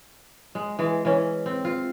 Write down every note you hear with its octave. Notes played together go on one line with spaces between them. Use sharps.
G#3
E3 G#3
E3 C#4
C4
F4